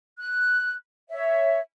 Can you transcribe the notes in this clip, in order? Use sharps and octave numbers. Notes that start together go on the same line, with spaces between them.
F#6
C#5 E5